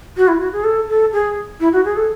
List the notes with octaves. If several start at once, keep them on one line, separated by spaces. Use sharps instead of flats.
F#4
E4
F#4
G#4
A4
A4
G#4
E4
F#4
G#4
A4